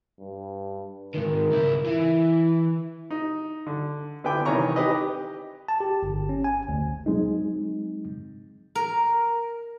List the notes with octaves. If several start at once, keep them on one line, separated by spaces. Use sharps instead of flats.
G2
G#2 D#3 A#4
C#2 E4
E3 E4
D#4
D3
D3 B3 E4 G5 D6
C3 D#3 E3 C#5 A#5 C#6
D#4 G4 B4 D#5
G4
A5
G4
G1
C#4
G#5
D2
F#3 G#3 C4 D#4
A#4